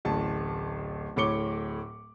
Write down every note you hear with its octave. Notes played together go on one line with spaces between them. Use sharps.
D1 A1 A5
D1 A2 C#5 D6 C#7 G7